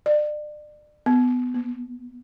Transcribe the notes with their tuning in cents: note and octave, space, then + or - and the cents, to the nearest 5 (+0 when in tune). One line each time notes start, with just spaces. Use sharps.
D5 +35
B3 +15
B3 -45